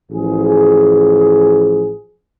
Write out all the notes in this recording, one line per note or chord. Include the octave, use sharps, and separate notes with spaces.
A1 F3 G#4